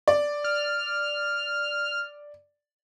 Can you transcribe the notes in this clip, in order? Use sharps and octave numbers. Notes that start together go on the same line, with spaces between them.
D5
F6